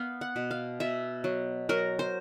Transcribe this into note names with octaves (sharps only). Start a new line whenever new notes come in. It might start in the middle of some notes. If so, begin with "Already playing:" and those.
Already playing: B3 F5
F#5
B2
F5
B2 E5
F#3
F#3 A#4
C5